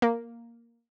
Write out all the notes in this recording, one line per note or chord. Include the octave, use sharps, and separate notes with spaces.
A#3